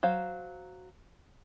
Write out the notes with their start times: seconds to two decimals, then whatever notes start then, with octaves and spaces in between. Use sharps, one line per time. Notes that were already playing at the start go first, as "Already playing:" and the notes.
0.03 F#3 C5 F5